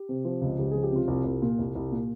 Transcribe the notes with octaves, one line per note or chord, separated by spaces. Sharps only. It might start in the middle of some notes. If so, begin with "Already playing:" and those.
Already playing: G4
C3
F3
C#2
C#2 G4
F3 G#4
G4
C3 F4
C2
C2
A#2
C2
C2
A#2